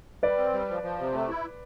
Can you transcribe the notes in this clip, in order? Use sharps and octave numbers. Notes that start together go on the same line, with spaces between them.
G3 B4 D5
C4
G3
F3
F3
C3
A3
E4